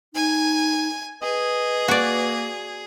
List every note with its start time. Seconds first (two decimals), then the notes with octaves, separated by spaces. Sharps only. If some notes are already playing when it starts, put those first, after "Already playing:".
0.14 D#4 G#5
1.22 G#4 B4 D#5
1.88 A#3 F#4 D5